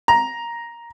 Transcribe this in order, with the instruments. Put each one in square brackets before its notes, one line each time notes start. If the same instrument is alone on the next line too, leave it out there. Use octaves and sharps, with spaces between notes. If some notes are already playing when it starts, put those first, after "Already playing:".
[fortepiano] A#5